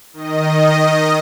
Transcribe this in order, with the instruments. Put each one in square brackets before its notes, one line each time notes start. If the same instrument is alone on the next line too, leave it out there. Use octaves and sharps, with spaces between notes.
[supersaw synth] D#3 D#5